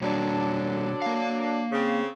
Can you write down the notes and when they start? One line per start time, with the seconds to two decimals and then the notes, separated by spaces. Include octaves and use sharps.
0.02 B2 D3 F#3 G3 A#3 D4
1.02 A#3 F5
1.71 C#3 C4